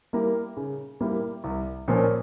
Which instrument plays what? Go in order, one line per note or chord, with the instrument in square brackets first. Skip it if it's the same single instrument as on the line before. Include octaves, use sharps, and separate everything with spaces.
[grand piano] G3 A#3 E4 A#4
C#3
G3 A#3 E4 A#4
C2
A#2 F3 A#3 C#4